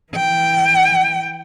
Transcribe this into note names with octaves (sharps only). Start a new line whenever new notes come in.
E3 G5